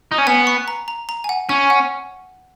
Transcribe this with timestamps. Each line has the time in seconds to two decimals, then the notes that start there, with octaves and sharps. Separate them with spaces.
0.12 D#4
0.18 C#4
0.27 B3 G#5
0.47 C#6
0.68 A#5
0.88 A#5
1.09 A#5
1.24 G#5
1.29 F#5
1.49 C#4 G#5
1.70 F#5